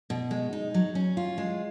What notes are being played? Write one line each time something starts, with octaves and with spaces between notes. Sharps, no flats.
B2
G#3
D#4
F#3
C#4
F4
G#3